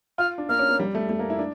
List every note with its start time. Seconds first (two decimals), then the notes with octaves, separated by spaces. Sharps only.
0.18 F4 F6
0.38 D4
0.49 A#3 F6
0.59 C#4
0.69 A#3
0.79 G3
0.95 A3
1.09 A3
1.19 A#3
1.30 E4
1.39 D4